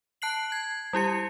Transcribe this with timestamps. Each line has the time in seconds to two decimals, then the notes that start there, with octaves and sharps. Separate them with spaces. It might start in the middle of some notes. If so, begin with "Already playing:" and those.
0.22 A5 F#6 C7 F#7
0.52 G#6
0.93 G3 E4 G4 C#7